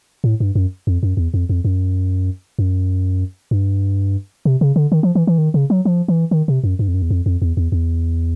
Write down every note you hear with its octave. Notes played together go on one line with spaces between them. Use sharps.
A2
G2
F#2
F2
F#2
E2
F2
F2
F#2
F#2
G2
C3
C#3
D3
D#3
F3
E3
E3
D#3
C#3
F#3
F3
E3
D#3
C3
F#2
G2
F2
F#2
E2
F2
F2
E2
E2
E2